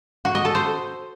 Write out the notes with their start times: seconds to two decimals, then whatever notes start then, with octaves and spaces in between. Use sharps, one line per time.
0.25 F#4
0.35 D#5
0.45 A4
0.55 C5